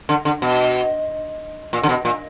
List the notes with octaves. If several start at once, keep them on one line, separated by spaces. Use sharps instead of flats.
D3
D3
B2
A#2
D3
B2
A#2